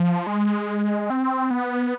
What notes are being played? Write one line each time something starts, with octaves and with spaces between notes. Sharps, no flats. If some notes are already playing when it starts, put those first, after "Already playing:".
Already playing: F3
G#3
C4
B3